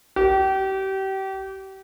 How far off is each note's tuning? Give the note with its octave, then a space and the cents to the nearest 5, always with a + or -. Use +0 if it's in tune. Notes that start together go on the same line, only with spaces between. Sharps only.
G4 -30